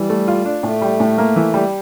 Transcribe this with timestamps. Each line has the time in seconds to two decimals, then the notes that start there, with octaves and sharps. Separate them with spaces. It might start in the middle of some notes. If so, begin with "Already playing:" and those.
Already playing: E3 G3
0.10 A3
0.28 F4
0.45 D4
0.63 A2 A3
0.82 G3
1.00 A2
1.18 A#3
1.36 E3
1.54 G3